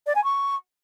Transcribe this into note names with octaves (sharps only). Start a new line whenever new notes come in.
D5
G#5
C#6